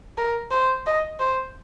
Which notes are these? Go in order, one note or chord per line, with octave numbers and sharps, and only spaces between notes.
A#4
C5
D#5
C5